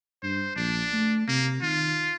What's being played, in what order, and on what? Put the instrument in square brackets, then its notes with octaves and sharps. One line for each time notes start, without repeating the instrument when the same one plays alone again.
[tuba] G2 [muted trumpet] C5
[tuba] A#1 [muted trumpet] D4
[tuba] A3
[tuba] C3 [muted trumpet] A#3
[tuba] D#3 [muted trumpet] F4